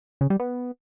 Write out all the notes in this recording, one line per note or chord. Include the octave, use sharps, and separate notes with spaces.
C#3
G3
B3